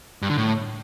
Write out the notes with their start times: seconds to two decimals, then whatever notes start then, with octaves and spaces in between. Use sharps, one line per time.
0.22 G2
0.30 D3
0.37 A2